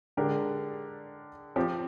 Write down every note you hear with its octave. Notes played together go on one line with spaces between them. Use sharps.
D3 G#3 D4 G4 A#4
F3 C4 G4